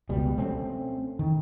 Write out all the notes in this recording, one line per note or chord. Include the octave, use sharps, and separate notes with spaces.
C#2 B2 G3
A3 C4 C#4
D#3